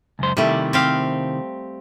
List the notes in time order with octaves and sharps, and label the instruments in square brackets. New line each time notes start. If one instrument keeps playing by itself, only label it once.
[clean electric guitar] C#2 F#2 C5
[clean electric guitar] C3 D#3 E4 [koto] G3 A3
[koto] C4 G4 F5